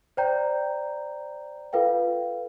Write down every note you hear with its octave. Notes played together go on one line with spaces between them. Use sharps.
C5 D5 G5 A#5 G6
F4 A4 B4 F5 G5